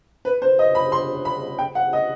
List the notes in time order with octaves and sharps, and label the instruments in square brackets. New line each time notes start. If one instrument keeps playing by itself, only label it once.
[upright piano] B4
C5
D#5
B5
C6
B5
G5
F#5
D#5